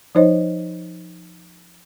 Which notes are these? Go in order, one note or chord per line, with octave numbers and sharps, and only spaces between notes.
F3 D#4 C5 C#5 D#5